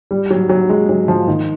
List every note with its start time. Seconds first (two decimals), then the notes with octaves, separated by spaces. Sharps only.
0.11 G3
0.31 F#3
0.49 F#3
0.69 G#3
0.89 F#3
1.08 F3
1.28 D#3